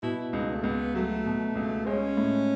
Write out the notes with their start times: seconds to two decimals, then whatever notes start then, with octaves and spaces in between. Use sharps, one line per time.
0.03 B2 E4
0.33 C#2 D#4
0.55 A3
0.64 C#2 B3
0.94 F#3 A3
1.25 B2
1.55 C#2
1.86 G#3 C#4
2.17 A2